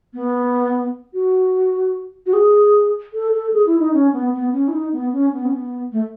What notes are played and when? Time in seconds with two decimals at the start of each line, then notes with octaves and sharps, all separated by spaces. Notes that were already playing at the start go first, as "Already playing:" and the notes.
0.14 B3
1.14 F#4
2.26 F#4
2.33 G#4
3.13 A4
3.33 A4
3.54 G#4
3.66 E4
3.79 D#4
3.93 C#4
4.13 B3
4.33 B3
4.53 C#4
4.68 E4
4.73 D#4
4.93 B3
5.13 C#4
5.33 B3
5.45 C#4
5.53 B3
5.92 A3